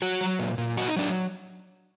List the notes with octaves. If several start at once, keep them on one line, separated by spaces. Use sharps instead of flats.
F#3 F#4
F#3
A#2
A#2
F#3 F#4
D#4
F#3 D4